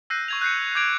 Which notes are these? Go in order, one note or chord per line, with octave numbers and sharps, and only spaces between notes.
E6 F#6 G6 A#6 C7 D#7
C#6 G#6 F7
F#6 G6 C7 C#7
D6 G6 G#6 D7 F7